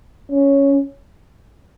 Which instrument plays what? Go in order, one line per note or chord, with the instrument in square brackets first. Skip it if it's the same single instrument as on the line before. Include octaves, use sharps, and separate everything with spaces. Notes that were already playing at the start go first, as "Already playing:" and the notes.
[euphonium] C#4